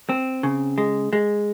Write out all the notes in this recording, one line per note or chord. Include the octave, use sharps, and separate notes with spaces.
C4
C#3
G#3
G#3